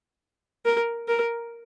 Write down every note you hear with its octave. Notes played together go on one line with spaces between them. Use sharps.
A#4
A#4